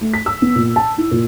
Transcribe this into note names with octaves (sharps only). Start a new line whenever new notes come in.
A3
B6
E6
B3
A#2
A5
E4
A#2